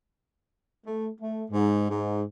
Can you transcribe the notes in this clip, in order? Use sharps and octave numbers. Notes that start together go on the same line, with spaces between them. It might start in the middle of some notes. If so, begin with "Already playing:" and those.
A3
A3
G#2
G#2